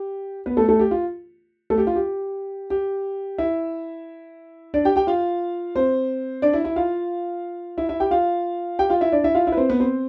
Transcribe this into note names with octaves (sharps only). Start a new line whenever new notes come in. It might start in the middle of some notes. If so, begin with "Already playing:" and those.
Already playing: G4
B3 B4
A3 A4
A3 A4
G4
F4
A3 A4
G4
F4
G4
G4
E4 E5
D4 D5
G4 G5
G4 G5
F4 F5
C4 C5
D4 D5
E4 E5
E4 E5
F4 F5
E4 E5
E4 E5
G4 G5
F4 F5
G4 G5
F4 F5
E4 E5
D4 D5
E4 E5
F4 F5
E4 E5
B4
C4 C5
B3 B4
C4 C5